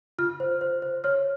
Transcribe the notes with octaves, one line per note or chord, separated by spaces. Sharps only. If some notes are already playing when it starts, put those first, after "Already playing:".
F4 F6
C5
C5
C5
C#5 F6